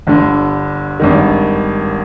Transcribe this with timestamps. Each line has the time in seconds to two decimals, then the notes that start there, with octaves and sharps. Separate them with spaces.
0.07 G1 G2 D3
1.00 G#1 G2 D#3